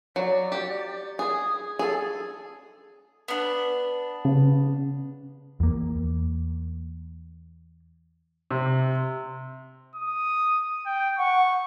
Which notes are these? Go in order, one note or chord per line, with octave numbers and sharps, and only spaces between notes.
F#3 D5
G4
G#4 D#6
G#4 A4
B3 D4
C#3
E2 A#3
C3
D#6
G5
F#5 C#6